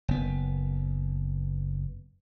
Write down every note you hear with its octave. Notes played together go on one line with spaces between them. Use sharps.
F#1 B3